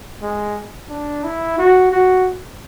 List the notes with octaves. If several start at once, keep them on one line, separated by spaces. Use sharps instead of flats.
G#3
D4
E4
F#4
F#4